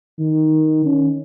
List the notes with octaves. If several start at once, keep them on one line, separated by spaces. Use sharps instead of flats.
D#3
C#4